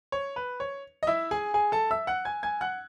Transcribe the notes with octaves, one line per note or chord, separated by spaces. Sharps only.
C#5
B4
C#5
D#5
E4 E5
G#4 G#5
G#4 G#5
A4 A5
E5 E6
F#5 F#6
G#5 G#6
G#5 G#6
F#5 F#6